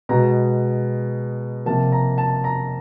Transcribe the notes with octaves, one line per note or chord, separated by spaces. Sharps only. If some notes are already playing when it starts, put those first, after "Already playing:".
B2 G#3 B3 A#5
C3 F3 A#3 A5
A#5
A5
A#5